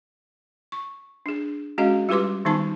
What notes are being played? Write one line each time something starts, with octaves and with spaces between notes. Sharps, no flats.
C#6
D4 G#4
G#3 C#4 F#4 G#4 D#5 F5
G3 F4 G4 B4 C6 D6
D#3 G3 B3 D#4 A5 C#6